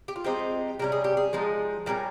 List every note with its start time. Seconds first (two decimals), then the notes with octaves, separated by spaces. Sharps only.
0.08 G4
0.16 F4
0.24 F3 G#3 C4 D#4 G4
0.79 C3 G3 C#4 A#4
0.92 G#4
1.04 G4
1.17 G#4
1.33 F3 G#3 D#4
1.86 A#2 G3 A#3 C#4 A#4